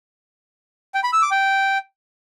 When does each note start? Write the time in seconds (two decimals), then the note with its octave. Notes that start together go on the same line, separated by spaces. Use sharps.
0.94 G5
1.04 B5
1.13 E6
1.22 D6
1.31 G5